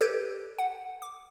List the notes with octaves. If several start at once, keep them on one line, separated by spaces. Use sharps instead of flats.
G4 A4 B4 G6 G#6 D7
F#5
D6